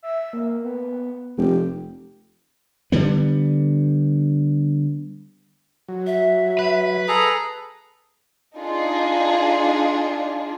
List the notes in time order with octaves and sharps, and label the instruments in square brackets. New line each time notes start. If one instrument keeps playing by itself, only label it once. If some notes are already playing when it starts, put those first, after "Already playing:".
[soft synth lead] E5
A#3
B3
[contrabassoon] F1 [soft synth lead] G4
[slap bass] D3 G3 B3
[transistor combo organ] F#3
[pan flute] E5
[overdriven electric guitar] B4
[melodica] G#4 A4 A#5
[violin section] D4 D#4 F4 G#4